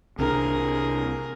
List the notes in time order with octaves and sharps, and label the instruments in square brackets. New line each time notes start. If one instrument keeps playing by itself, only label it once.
[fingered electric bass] C2 C3 D4 [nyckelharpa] G#4 A#4